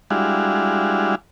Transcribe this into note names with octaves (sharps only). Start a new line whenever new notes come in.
G3 G#3 D4 E4 F#4 F5